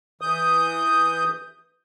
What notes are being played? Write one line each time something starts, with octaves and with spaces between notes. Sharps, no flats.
E3 D#6 G6